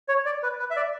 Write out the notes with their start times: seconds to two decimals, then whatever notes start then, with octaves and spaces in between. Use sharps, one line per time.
0.08 C#5
0.26 D5
0.43 B4
0.59 B4
0.70 E5
0.76 D5